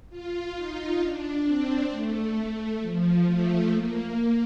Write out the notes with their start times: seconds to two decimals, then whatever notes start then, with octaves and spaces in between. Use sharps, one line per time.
0.10 F4
0.56 D#4
1.00 D4
1.45 C4
1.91 A3
2.81 F3
3.25 A3
3.71 A#3